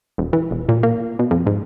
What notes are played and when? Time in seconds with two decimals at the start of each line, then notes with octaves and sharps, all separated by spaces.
0.18 E1
0.33 E3
0.51 E1
0.69 A#2
0.83 A#3
1.19 B2
1.31 F2
1.46 G#2